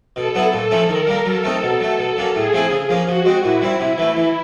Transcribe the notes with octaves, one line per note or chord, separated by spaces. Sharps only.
B2 A4
F#3 B3 E4
A#2 A4
F3 A3 C#4
D#3 A#4
G3 A#3
F#3 A4
A3 C4 D#4
B2
F#3 A3
B2
F#3 A#3 C#4
A2 G#4
F3 A3 C4 E4
C#3
F3 A#3 C#4
F3 F#4
G#3 C4
A#2 E4
G3 C4
C3
E3 A3
E3